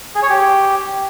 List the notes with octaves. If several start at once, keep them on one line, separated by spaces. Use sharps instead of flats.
G#4
C#5
G4